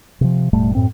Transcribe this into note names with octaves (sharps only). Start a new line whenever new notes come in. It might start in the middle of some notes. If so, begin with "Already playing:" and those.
C3 F3
E1 A2 G3 A3
F#2 A2 C4